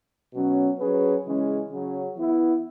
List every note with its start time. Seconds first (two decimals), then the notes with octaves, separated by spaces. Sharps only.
0.32 B2 F#3 C#4
0.78 F#3 C#4 G#4 B4
1.24 C#3 E3 G#3 C#4
1.70 C#3 F#3 C#4
2.16 E3 B3 E4